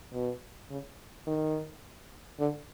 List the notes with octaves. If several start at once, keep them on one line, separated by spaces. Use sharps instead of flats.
B2
C#3
D#3
D3